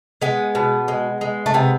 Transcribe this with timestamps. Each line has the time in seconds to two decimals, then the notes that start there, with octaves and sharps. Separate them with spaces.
0.22 G#3 B3
0.55 B2
0.88 G#3
1.21 G#3
1.46 A3
1.54 C3 B3